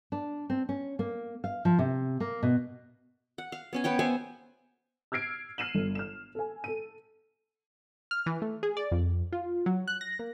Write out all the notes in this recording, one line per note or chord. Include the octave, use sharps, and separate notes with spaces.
D4
C4
C#4
A#3
F5
F3
C3
A#3
B2
F#5
F5
B3 C#4 G#5
B3 B4 C#5 G5
B3 C5 E5 G#5
E6 F6 G#6 C7 D7
F6 C7 D#7 E7 F#7
G1
F6 E7
A4 G#5
A4 D#7
F6
E3
A3
G#4
D5
F2
F4
F#3
F#6
A#6
A#3